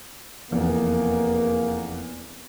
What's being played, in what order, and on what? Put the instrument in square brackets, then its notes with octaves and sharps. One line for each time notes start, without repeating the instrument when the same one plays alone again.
[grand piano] F1 E2 [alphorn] A#3